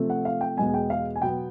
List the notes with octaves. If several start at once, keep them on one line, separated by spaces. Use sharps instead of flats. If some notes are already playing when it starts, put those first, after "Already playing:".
Already playing: C3 F3 A3 C4
F#5
F5
G5
E2 B2 G#3 B3 G#5
G5
F5
G#5
B2 F#3 B3 G5